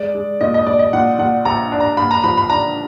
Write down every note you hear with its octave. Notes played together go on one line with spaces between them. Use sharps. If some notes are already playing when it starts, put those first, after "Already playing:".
Already playing: G#3 D5
G#3
A#2 D#5
D#5
A#2 D5
D#5
A#2 F#5
A#2 F#5
A#1 A#5
D4
A#5
A#3 B5
A#5
F3 B5
B5
D4 A#5